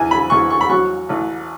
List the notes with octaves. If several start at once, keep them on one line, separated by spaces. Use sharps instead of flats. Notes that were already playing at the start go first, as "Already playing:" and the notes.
Already playing: E2 G#5
B5
E2 C#6
C#6
B5
F#3 C#6
A1